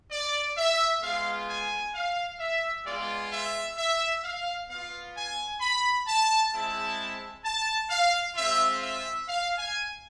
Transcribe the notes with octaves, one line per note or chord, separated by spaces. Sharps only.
D5
E5
G#3 B3 F4 F5
G#5
F5
E5
G#3 B3 F4 D5
E5
E5
F5
B3 F4 F5
G#5
B5
A5
G#3 C4 E4 A5
A5
F5
G#3 C4 F4 E5
E5
F5
G#5